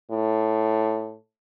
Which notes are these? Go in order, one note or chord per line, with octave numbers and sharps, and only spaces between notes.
A2